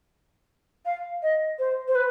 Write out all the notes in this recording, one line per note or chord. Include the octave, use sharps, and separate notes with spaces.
F5
D#5
C5
C5
B4